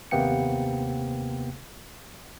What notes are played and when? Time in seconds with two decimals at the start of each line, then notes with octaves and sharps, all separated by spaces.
0.11 D#2 C3 A#3 B3 G5 C#7